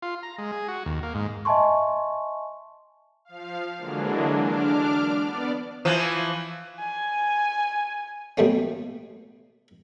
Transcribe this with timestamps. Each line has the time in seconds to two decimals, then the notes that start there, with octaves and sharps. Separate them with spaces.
0.02 F4
0.23 A#5
0.38 G#3
0.52 G#4
0.68 F#4
0.86 D#2
1.03 A#3
1.15 G#2
1.45 D#5 E5 G#5 A5 C6 C#6
3.25 F3 F5
3.78 D3 E3 F#3 G#3 A#3 D4
4.43 D4 D6 F6
5.15 B3 D5
5.85 E3 F3
6.80 G#5
8.37 B2 G3 A3 A#3 C#4